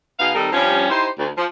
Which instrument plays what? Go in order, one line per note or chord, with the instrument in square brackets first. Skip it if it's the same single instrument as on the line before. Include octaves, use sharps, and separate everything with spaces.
[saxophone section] B2 B3 D#4 G#4 F5
D#3 G3 C4 D#4 A4 A#4
G2 F3 G3 C4 C#4
D#4 E4 G4 C5
D2
F3